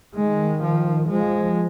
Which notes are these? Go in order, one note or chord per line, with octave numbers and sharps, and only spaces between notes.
D#3 G#3
F3
F3 G#3